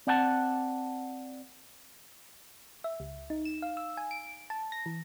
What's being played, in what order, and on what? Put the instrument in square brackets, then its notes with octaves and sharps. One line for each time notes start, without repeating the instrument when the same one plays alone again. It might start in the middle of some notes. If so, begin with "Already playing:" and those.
[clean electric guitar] C4 D5 F#5 G5 A5
[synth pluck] E5
C#2
D#4
E7
F5
E6
G#5
D7
A5
A#6
E3